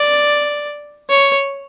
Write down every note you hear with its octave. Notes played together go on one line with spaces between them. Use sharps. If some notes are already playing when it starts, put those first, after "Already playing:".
Already playing: D5
C#5